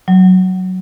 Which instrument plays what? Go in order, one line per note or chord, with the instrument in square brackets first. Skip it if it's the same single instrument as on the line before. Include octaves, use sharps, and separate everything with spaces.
[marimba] F#3